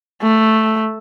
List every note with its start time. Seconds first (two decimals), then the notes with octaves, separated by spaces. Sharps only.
0.22 A3